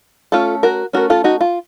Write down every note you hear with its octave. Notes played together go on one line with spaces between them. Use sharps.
A3 C#4 F4 A4
F#4 A#4
A3 C#4 F#4 A#4
F4 A4
D#4 F#4
F4